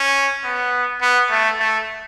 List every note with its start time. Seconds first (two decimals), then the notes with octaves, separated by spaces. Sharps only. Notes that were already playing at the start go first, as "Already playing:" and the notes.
Already playing: C#4
0.44 B3
1.02 B3
1.30 A3
1.60 A3